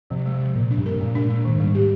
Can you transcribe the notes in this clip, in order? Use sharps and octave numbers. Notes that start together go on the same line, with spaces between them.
C3 F3
G#3
F3
A#2 A#3
D4
G2
A#4
C3
A#2 G#3
D4
G#3
A#2 D#3
G#2
G3
G#2
G4